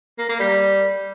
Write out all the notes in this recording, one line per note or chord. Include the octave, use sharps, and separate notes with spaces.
A#3
A#3
G3